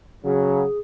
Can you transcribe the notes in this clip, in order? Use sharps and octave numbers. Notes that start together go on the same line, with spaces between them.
C#3 F#3 G#4